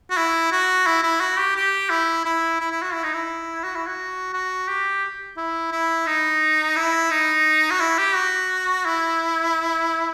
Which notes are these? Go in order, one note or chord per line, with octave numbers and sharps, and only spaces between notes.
F#4
E4
F#4
E4
E4
F#4
G4
G4
E4
E4
E4
E4
F#4
E4
D#4
E4
F#4
E4
F#4
F#4
G4
E4
E4
D#4
E4
D#4
F#4
E4
G4
F#4
E4